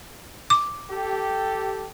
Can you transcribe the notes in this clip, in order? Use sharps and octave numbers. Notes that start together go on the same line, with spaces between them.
D6
G4 A4